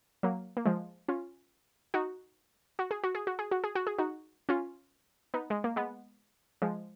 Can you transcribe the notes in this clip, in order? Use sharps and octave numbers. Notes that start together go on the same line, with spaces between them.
F#3 A#3
A#3
F3 G#3
C#4 F4
D#4 F#4
F#4
G#4
F#4
G#4
F#4
G#4
F#4
G#4
F#4
G#4
D#4 F#4
C#4 F4
B3 D#4
G#3
A#3
G#3 B3
F3 G#3